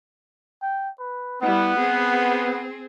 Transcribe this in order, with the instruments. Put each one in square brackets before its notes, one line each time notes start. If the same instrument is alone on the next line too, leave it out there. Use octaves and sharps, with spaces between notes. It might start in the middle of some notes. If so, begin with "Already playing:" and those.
[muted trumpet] G5
B4
[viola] G3 E4 [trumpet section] B3 [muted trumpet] F#5
[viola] C4 G#4